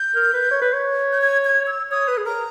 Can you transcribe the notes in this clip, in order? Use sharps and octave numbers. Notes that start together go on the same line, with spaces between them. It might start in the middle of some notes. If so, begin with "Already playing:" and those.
Already playing: G6
A#4
B4
C#5
B4
C#5
G6
G#6
G#6
E6
C#5 D#6
B4
G#4
A#4 A#5